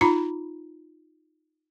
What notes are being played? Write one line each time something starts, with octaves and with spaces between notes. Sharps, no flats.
D#4 F4 A#5 B5